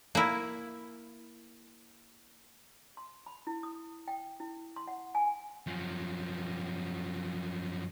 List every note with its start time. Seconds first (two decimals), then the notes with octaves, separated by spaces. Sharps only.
0.15 A#3 E4
2.97 C6
3.26 B5
3.47 E4
3.63 D#6
4.08 G5
4.40 E4
4.76 C6
4.88 F#5
5.15 G#5
5.67 F#2 F3